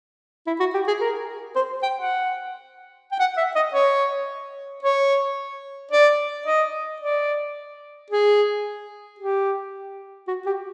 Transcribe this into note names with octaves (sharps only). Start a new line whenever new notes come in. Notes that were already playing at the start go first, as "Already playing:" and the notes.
E4
F#4
G4
G#4
A#4
C5
G5
F#5
G5
F#5
E5
D#5
C#5
C#5
D5
D#5
D5
G#4
G4
F#4
G4